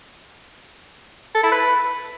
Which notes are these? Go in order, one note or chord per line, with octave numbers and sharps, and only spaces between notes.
A4
E4
B4